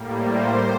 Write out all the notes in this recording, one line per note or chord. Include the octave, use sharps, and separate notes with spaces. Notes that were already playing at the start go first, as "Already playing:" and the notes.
Already playing: A2 G3 A#3
C5